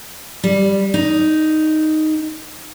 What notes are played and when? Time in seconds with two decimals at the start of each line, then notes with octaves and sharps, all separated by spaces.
0.44 G3
0.94 D#4